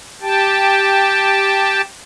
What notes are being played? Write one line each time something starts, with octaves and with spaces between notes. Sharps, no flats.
G4 G5 A5